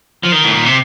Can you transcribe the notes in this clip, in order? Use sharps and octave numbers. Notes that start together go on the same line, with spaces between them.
F3
D#3
A2
A#2
C3